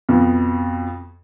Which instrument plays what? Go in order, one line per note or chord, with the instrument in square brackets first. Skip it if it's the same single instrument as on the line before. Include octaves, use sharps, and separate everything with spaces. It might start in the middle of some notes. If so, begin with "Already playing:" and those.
[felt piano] F2 B2